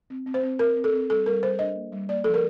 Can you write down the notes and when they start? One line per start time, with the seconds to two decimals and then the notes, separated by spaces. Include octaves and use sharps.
0.10 C4
0.26 C4
0.34 C5
0.43 C4
0.59 C4 A#4
0.76 C4
0.84 A4
0.93 C4
1.10 G3 A4
1.26 G3 A#4
1.43 G3 C5
1.59 D4 D#5
1.76 A#3
1.92 G3
2.09 A#3 D5
2.24 F3 A4
2.34 A#4